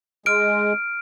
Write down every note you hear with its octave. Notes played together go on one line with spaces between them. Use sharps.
G#3 F6 D7